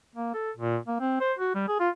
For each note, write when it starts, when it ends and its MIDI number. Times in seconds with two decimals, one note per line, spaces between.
0.15 0.31 58
0.34 0.51 69
0.57 0.78 46
0.87 0.99 58
1.00 1.19 60
1.20 1.33 72
1.39 1.53 66
1.55 1.63 55
1.68 1.77 68
1.80 1.90 65